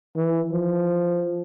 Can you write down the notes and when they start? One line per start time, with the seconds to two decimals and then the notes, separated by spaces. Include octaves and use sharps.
0.16 E3
0.52 F3